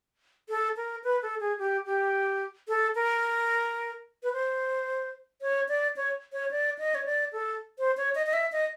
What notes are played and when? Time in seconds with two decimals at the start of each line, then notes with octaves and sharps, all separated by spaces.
0.49 A4
0.77 A#4
1.04 B4
1.22 A4
1.40 G#4
1.58 G4
1.86 G4
2.68 A4
2.95 A#4
4.23 B4
4.33 C5
5.42 C#5
5.69 D5
5.97 C#5
6.33 C#5
6.51 D5
6.79 D#5
6.95 C#5
7.06 D5
7.33 A4
7.79 C5
7.97 C#5
8.15 D#5
8.26 D#5
8.33 E5
8.52 D#5